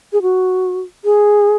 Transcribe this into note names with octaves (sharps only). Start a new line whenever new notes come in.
G#4
F#4
G#4